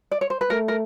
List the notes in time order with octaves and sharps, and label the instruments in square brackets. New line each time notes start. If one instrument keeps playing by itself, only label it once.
[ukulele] D5
C#5
C5
B4
[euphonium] A3 [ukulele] A#4
[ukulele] A#4